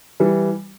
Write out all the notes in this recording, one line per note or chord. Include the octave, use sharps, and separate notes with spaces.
E3 G3